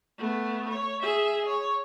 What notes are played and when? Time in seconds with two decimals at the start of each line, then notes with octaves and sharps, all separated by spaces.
0.18 A3 B3
0.69 C#5
1.02 G#4 E5
1.46 C#5